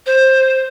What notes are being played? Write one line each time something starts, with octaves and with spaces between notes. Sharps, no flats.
C5